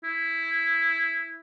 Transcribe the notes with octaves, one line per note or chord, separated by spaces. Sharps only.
E4